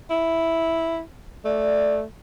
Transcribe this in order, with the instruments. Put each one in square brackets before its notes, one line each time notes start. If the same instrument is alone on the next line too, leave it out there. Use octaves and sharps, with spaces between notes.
[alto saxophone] E4
[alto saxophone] A3 [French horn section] D5